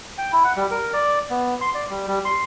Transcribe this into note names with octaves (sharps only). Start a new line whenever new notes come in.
G5
E4
F#5
G3
A#4
D5
B3
C6
D5
G3
G3
C6